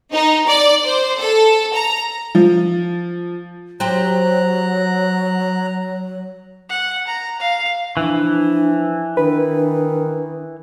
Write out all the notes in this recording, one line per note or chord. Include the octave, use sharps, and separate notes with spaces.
D#4
D5
C5
A4
A#5
F3
F#3 G4 C5 A#5 F#6
F#5
A#5
F5
E3 F3 D4
D#3 D4 B4